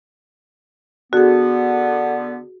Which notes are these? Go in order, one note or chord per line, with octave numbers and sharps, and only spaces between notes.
D3 B3 F#4 G#4